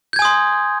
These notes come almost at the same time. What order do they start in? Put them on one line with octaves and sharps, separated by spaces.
G6 G#6 G#5 D#6 C6